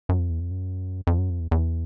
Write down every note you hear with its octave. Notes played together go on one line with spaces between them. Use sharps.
F#2
F2
E2
F2
F#2
F2
F#2
F2
E2
E2